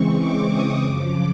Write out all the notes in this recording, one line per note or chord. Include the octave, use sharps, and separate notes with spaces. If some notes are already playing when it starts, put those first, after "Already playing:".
Already playing: C#3 E3 G#3 C4 C#6
D6
D#6
F#2 C#3 F3 D6